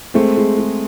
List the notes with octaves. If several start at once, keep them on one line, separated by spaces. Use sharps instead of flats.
G#3 A3 C4
G#3
G#3